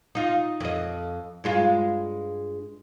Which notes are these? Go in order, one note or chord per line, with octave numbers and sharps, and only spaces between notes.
D#4 F4
F2 D#5
G2 G#3 F4